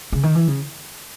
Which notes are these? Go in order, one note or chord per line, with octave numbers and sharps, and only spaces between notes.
C#3
D#3
E3
C#3